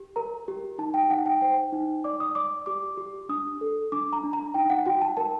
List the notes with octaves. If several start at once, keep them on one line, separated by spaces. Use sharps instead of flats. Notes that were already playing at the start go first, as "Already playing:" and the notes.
Already playing: G4
A#4 A#5
G4
D#4 A5
G5
D#4 F#5
G5
C5 G5
D#4
D5 D6
D#6
D5 D6
G4 D6
G4
D4 D#6
A4
D4 D6
A#5
D4
A#5
D#4 G5
F#5
F#4 G5
A5
A#4 A5